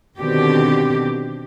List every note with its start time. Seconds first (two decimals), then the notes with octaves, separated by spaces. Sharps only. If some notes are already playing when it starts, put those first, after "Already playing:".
0.19 B2 D3 D#3 C4 G4